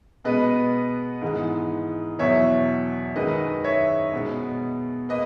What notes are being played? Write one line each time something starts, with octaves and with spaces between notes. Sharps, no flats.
B2 G#3 B3 B4 D#5
G#2 E3 G#3 B3
E2 B2 F#3 C#5 E5
F#2 D#3 G#3 B4 D#5
C#5 E5
B2 G#3 B3
A#3 B4 D#5